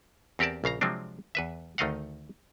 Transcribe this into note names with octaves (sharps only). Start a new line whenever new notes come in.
E2 C4 G4 A#4 D5 A5
A#1 C#3 F5 A#5
C3 F3 F#3 G#3 C4 D4
E2 B4 E5
D2 D#3 A3 D#5 F5 F#5